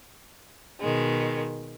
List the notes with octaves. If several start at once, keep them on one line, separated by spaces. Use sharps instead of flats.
B2 D#3 G#3